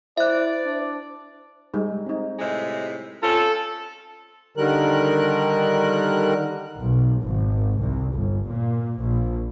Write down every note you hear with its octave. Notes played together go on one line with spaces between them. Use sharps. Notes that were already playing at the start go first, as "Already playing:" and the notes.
E4 C5 D5 E5 F#6
D4
G3 G#3 D#4
C4 D#4
A2 C3 G#3
C4 C#4 F4 A4
D3 D#3 G3 A#4 F#6
B1
G#1
C2
G1
A#2
A#1